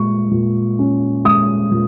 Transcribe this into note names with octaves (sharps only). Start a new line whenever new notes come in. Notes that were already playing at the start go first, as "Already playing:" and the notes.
Already playing: A#2 G#3 C#6
A#2
C#4
G#3 D#6
A#2